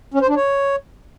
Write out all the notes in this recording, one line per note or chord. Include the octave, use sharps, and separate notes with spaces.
C#4
C5
D4
C#5